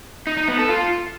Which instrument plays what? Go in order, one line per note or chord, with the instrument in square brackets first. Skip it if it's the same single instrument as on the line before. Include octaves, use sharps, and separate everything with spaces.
[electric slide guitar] D#4
D#4
B3
A4
F4